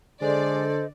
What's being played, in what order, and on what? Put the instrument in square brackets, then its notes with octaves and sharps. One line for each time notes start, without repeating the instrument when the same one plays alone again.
[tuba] D3 [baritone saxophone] G#3 [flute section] A4 C5 D#5 [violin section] D5